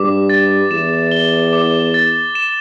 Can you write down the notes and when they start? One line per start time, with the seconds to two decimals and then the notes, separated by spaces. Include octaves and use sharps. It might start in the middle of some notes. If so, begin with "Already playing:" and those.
Already playing: G2 D6
0.29 A6
0.71 E2 E7
1.11 G7
1.53 D6
1.94 A6
2.35 E7